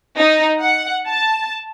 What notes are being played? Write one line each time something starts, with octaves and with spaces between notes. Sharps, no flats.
D#4
F#5
A5